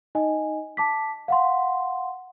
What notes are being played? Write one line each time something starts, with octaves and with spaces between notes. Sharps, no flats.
D#4 D#5 G#5
A5 D6 B6
F5 F#5 C6